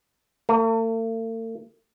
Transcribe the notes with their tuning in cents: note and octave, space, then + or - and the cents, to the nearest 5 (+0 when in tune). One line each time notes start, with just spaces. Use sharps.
A3 +45